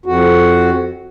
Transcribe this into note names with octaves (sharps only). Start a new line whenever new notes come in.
F2 F#4